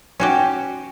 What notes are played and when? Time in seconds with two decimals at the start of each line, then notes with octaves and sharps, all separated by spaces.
0.20 C#4 F#4 G4